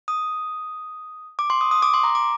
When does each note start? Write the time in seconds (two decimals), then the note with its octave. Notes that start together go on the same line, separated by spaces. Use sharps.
0.08 D#6
1.39 D6
1.50 C6
1.61 D#6
1.71 D#6
1.82 D6
1.94 C6
2.04 A#5
2.15 D6